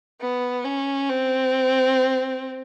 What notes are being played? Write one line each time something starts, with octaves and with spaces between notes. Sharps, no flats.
B3
C#4
C4